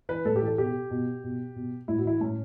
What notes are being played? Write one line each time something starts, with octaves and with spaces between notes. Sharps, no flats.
E3 B4
A2 A4
G4
E3
A4
B2 G4
B2
B2
B2
A2 E4
F#4
E3 E4
A2 C#4